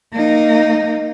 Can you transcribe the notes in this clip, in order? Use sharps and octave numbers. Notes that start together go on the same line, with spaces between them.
A#3 D#4